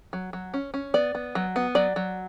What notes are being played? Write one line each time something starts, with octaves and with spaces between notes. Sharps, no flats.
F#3
F#3
C#4
C#4
B3 D5
B3
F#3
B3
F#3 D5
F#3